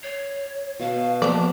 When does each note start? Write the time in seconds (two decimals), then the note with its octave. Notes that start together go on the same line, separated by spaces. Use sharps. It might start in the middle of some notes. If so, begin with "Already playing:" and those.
0.03 C#5 C7
0.79 B2 F5 A5
1.22 F3 A#3 B3 B4 C5 D5 A5